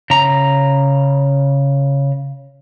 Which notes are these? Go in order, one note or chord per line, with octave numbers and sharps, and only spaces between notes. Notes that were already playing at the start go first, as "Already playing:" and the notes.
C#3 A#5